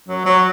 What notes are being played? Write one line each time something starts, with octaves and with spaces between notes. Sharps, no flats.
F#3
F#3